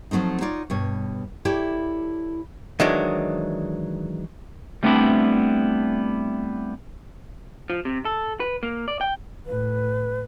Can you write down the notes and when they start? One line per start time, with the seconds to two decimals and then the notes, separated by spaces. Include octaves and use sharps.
0.11 F3 F#3 A3 C4 D#4
0.41 D#4 F4 C#5 D5
0.70 G2 B2 C#5
1.45 E4 G4 A4 C#5 D5
2.80 D#3 E3 F#3 G#3 D4
4.83 G3 A3 B3 C4 D4 E4
7.70 F3
7.85 C3
8.05 A4
8.40 B4
8.63 A#3
8.88 D5
9.01 G5
9.46 A2 B4